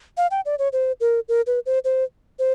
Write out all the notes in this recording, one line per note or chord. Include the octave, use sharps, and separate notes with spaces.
F5
G5
D5
C#5
C5
A#4
A#4
B4
C5
C5
C5